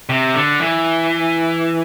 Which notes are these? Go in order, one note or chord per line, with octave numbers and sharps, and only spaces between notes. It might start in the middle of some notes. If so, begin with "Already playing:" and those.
C3
D3
E3